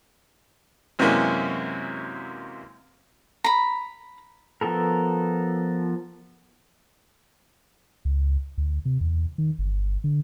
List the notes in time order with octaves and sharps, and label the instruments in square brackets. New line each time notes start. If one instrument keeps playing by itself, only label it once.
[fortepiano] F#2 C3 E3 G#3 A#3 C#4
[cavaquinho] A#5 B5
[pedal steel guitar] F3 B3 A4 A#4
[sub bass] C#2
D2
C3
E2
D#3
G1
D3